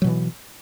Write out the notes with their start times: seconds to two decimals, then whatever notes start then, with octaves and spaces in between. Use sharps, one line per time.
0.02 F#3
0.04 B2
0.07 E3